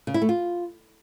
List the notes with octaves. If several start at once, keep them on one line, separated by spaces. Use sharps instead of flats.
C#3
E4
A3
F4